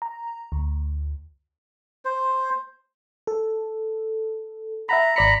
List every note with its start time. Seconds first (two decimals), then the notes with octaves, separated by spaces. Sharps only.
0.02 A#5
0.52 D2
2.05 C5
3.27 A4
4.89 E5 F#5 A#5 B5
5.16 G#1 D5 A#5 B5 C#7